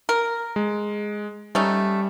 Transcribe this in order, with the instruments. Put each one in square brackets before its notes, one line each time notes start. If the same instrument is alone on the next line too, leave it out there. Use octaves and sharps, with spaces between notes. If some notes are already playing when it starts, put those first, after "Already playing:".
[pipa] A#4
[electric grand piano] G#3
[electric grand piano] G3 [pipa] A3 C#4 D#4